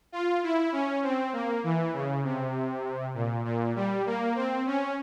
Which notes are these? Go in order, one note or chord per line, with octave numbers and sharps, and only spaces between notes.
F4
E4
C#4
C4
A#3
E3
C#3
C3
A#2
A#2
G3
A#3
C4
C#4